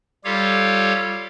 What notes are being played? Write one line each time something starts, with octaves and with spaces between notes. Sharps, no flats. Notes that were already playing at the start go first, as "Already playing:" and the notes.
G3 F4 G4 A4 C#5 F5